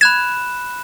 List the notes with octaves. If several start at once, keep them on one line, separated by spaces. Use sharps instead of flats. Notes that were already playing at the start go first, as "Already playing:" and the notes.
B5 F#6 G#6 E7